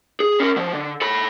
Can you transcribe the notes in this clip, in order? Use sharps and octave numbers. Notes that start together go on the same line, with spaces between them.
G#4
C#4 A#4
F3 F#3
D3
A4 B5